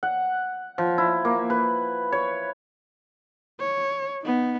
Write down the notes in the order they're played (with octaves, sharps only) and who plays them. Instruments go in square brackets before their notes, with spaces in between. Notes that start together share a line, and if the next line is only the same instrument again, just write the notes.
[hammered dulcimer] F#5
F3
E4
A#3
B4
C#5
[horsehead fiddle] C#5
B3 D#4